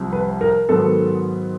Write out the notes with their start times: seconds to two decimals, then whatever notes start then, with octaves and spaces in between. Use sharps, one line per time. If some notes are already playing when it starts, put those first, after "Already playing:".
Already playing: C2 C3 F3
0.13 B4
0.41 A#4
0.69 G#2 D#3 F#3 B3 A4